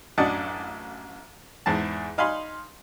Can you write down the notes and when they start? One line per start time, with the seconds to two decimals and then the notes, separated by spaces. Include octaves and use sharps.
0.18 A1 F#2 D4 D#5 F#5 A5
1.66 E2 G#2 G#4 A5
2.18 D#4 F5 G#5 B5 C6